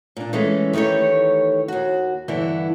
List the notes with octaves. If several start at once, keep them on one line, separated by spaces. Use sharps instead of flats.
A#2 D4
E3 G#3 A3 C#4
D#3 E3 A3 G4 C#5
D#2 F#4
G2 D3 E3 B3 E4